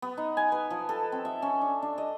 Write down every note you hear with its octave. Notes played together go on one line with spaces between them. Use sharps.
B3
D#4
G#5
B4
F3
A4
C4
E5
C#4
D4
D4
D#5